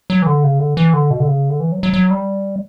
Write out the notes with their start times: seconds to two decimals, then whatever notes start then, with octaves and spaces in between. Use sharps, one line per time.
0.10 F#3
0.22 E3
0.26 D3
0.44 C#3
0.59 D3
0.77 E3
0.94 D3
1.10 B2
1.20 D3
1.28 C#3
1.50 D3
1.60 E3
1.72 F#3
1.83 F#3
1.93 F#3
2.11 G3